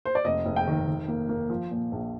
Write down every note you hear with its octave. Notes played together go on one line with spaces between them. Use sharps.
C5
D5
F1 D#5
F1
G5
D#3
D#3
A#3
A#3
F3
A#2
A#1